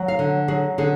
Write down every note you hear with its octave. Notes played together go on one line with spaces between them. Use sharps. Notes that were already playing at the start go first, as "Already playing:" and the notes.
Already playing: F#3
F5
D3
F#3 G#4
D3 G#4